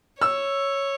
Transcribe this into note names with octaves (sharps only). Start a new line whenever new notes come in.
C#5 E6